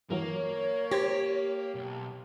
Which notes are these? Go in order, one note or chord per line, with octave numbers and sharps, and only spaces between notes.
G2 E3 F#3 A#3 C#5
G4 C5 G#6 A#6
B1